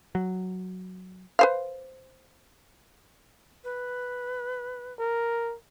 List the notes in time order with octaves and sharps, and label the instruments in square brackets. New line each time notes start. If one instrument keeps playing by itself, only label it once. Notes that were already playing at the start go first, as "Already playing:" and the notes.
[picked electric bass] F#3
[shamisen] B4 C5 F5
[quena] B4
[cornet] A#4